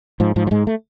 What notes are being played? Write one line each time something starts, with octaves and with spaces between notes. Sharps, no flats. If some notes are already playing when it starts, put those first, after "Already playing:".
G#2 F3
G#2 F3
F3
G#2 G#3
A3